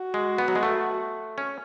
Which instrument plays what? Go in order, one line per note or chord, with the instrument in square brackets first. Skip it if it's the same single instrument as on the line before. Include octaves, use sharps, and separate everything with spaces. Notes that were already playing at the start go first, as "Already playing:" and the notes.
Already playing: [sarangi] F#4
[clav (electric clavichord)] G#3
B3
F#3
G#3
A3
C#4